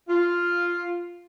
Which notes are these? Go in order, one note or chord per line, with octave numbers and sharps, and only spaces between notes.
F4